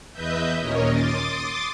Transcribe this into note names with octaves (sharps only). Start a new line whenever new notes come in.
E2 B4 D#5 E5 G6
D#2 A#2 C#4 A#4 C#5 D#5
C6 D6 D#6 A6